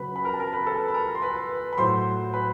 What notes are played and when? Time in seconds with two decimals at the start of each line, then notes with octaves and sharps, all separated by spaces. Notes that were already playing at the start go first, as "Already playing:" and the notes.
Already playing: C#3 F#3 B4 B5
0.16 B5
0.25 A#4 A#5
0.34 A5
0.39 A#4 A#5
0.53 B4 B5
0.67 A4 A5
0.88 B5
0.94 A#4 A#5
1.15 C6
1.22 B4 B5
1.73 B5
1.78 A2 F#3 C5 C6
2.33 B4 B5